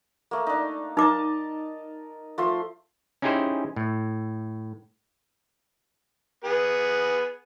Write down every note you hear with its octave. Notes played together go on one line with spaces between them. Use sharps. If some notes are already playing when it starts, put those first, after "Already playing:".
A3 A#3
D4 D#4
D#4 A#4 D#5 A5 D6
F3 A3 C6
C#4 D#4 E4 G4 G#4 C5
A2
B3 G#4 B4